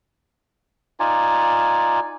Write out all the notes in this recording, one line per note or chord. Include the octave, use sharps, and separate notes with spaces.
D#4 F4 D5 G#5